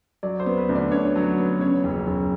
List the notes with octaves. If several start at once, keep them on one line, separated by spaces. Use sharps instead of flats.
F#3 D5
C5
B3
B4
D2
D5
D3 C#5
F#3
B3
C#3 C#5
F#1
F#1